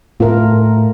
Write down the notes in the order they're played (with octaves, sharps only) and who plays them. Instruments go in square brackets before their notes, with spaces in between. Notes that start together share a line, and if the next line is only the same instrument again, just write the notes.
[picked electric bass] A2 [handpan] F4 A#4